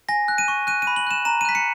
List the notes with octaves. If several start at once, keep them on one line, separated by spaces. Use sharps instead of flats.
G#5 A#6
F#6
D#7
C#6
F#6 D#7
D#7
B5
F#7
F#6 E7
A#5 E7
D#7
F#6 B6
C#7